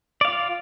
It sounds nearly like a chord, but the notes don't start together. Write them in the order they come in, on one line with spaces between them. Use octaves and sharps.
D5 F5 F4